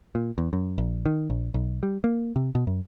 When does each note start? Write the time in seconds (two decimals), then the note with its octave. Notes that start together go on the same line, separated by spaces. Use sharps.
0.15 A#2
0.38 E2
0.53 F#2
0.78 A#1
1.06 D#3
1.30 A#1
1.54 B1
1.83 G3
2.04 A#3
2.36 C3
2.55 B2
2.67 F#2